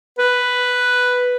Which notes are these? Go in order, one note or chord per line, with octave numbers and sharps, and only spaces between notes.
B4